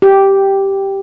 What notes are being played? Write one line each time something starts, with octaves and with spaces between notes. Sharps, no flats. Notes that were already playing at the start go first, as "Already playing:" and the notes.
G4